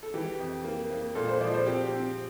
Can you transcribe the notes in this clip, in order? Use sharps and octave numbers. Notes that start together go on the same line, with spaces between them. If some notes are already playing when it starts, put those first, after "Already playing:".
A4
E3 G4
F2
A#3
A#3
A#2 A4
C5
F3 D5
C5
C4 G4
C4